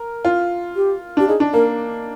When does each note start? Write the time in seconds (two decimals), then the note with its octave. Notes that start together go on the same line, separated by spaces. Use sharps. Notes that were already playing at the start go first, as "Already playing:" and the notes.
Already playing: A#4
0.25 F4
0.76 G4
1.17 D4 G4
1.28 D#4 G#4
1.40 D4
1.53 A#3 A#4